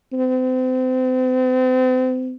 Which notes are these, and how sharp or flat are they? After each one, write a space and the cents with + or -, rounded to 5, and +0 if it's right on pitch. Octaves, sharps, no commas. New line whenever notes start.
C4 -35